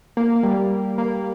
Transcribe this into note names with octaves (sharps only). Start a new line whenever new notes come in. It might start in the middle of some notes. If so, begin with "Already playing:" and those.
A#3
A#3
G3
A#3